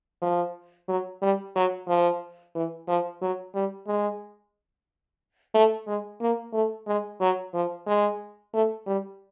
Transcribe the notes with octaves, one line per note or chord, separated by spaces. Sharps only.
F3
F#3
G3
F#3
F3
E3
F3
F#3
G3
G#3
A3
G#3
A#3
A3
G#3
F#3
F3
G#3
A3
G3